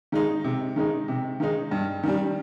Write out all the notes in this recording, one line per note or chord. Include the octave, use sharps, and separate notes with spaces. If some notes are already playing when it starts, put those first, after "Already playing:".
D#3 G#3 D#4
C3
D#3 G#3 D#4
C3
D#3 G#3 D#4
G2
D#3 G3